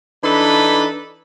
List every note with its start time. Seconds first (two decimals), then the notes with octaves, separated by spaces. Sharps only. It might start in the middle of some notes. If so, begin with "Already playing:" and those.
0.24 E3 D4 D#4 A4 B4 B5